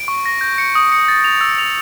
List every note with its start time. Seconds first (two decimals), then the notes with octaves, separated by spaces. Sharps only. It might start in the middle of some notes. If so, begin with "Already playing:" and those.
Already playing: D7
0.08 C#6
0.26 A#6
0.41 G6
0.58 C#7
0.75 D#6
0.92 C#7
1.08 A6
1.24 F7
1.41 E6
1.59 F7